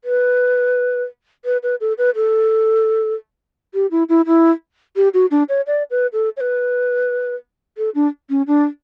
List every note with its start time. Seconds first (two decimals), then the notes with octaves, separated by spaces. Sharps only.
0.04 B4
1.45 B4
1.63 B4
1.81 A4
1.98 B4
2.15 A4
3.74 G4
3.91 E4
4.09 E4
4.26 E4
4.96 G4
5.14 F#4
5.31 D4
5.49 C#5
5.67 D5
5.91 B4
6.13 A4
6.37 C#5
6.41 B4
7.77 A4
7.95 D4
8.30 C#4
8.47 D4